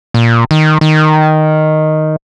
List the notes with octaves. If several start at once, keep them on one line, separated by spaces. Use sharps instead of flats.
A#2
D#3
D#3